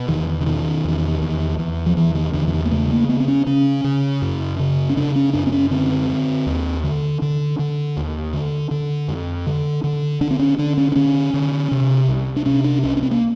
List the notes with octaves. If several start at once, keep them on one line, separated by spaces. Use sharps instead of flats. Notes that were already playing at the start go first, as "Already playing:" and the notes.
Already playing: B2
E2 D#3
D3
B2 D#3
E2
E2
E2
F3
E2 E3
D#3
E2 D3
E3
D#3
A#3
C#3 A3
A#3
C#3 B3
C4
C#4
C#3 C#4
C#3
F#2
C#3
C#4
C#3 D4
C#4
F#2 D4
C4
C#4
D3 C4
D3
D#2
D3
D3
D3
D#2
D3
D3
F2
D3
D3
D3 D4
C4
C#4
D3 D4
C#4
D4
D3 C#4
D3
C3
C2
D4
C3 C#4
D4
C2 C#4
C#4
C4
A#3